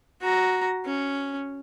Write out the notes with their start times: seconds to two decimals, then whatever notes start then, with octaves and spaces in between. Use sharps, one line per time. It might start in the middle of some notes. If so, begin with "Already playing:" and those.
0.22 F#4 A#5
0.85 C#4